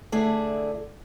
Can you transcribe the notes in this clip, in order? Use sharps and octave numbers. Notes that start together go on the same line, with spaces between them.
D3 A3 E4 G#4 D5